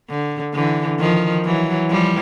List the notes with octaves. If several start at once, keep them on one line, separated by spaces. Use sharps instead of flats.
D3
D3 E3
D#3 F3
E3 F#3
F3 G3